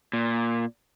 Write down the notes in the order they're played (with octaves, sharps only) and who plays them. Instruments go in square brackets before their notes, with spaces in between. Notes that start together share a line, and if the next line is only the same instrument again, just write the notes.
[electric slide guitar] A#2